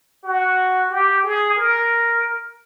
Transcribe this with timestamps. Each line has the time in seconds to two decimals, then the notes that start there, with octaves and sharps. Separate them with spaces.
0.24 F#4
0.90 G4
1.24 G#4
1.56 A#4